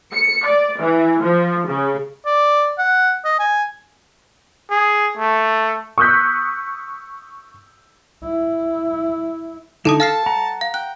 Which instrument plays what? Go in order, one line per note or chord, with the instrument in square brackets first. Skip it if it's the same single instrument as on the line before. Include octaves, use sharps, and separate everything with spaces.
[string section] C#7
D5
E3
F3
C#3
[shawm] D5
F#5
D#5
G#5
[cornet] G#4
A3
[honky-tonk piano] C#6 D#6 E6 F#6 G6 B6
[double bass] E4
[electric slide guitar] D3 D#4 E4 [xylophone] A4 A5 D#6
[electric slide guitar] A4 [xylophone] F5 F6 C7 [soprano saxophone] A5
[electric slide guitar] F#5 A#5
[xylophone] F5
[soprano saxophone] G5 [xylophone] F#6